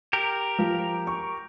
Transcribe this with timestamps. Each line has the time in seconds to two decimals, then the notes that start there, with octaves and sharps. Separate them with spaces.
0.13 G4 A#4
0.59 F3
1.07 C#6